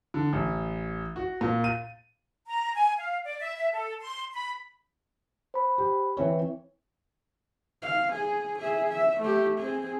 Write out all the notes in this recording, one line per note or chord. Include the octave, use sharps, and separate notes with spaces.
D3
A1
F#4
A#2
D#7
A#5
G#5
F5
D5
E5
E5
A4
C6
B5
C5 B5
G4
E3 C4 C#5
F5
G#4
G#4 E5
E5
A3 G4
C4 G#4